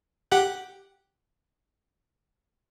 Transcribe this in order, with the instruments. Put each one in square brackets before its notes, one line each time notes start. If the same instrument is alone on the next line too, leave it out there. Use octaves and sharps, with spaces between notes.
[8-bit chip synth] G4 F#5 F#6